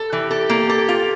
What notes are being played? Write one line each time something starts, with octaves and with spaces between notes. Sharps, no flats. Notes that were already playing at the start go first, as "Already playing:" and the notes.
Already playing: A4
E3 G4
A4
A#3
A4
F4